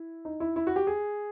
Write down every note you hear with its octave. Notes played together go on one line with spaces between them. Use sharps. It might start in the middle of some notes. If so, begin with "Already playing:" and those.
Already playing: E4
D#4
E4
E4
F#4
G4
G#4